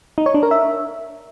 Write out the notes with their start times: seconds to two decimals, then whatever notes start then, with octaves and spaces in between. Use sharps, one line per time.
0.18 D#4
0.26 C#5
0.34 D4
0.43 A#4
0.51 E5